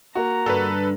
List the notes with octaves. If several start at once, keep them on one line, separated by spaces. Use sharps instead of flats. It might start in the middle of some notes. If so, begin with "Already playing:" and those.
A#3 F#4 A#5
G2 D3 A4 B4